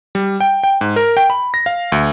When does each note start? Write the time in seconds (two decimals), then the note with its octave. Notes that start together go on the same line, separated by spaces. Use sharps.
0.15 G3
0.40 G5
0.64 G5
0.81 G#2
0.96 A#4
1.17 G5
1.30 B5
1.54 A#6
1.66 F5
1.92 D2